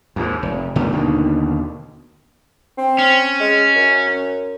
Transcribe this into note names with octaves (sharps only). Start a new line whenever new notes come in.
D#2 G#2
F1
F1 B2 D#3 A3
D#2 B2 D3 D#3
C4
C#4
G#3
F#2